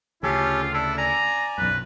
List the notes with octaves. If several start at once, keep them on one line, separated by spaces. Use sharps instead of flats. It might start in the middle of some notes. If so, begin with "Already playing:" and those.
D2 C#3 C#4 F4 G4 A4
D4 E4 A4
D5 G#5 A#5
B1 F#2 B4